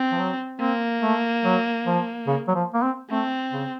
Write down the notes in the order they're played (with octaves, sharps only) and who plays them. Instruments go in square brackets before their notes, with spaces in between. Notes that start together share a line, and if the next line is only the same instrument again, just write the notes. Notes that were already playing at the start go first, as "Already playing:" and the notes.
Already playing: [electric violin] C4
[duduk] F3
F#3
[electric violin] A#3 [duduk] C4
[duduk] A3
F#3
F3
C#3
F#3
F3
A#3
C4
[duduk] A3 [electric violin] C4
[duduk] C#3